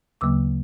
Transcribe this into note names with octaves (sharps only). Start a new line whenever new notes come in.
D2 C#3 F#3 A#3 D6 E6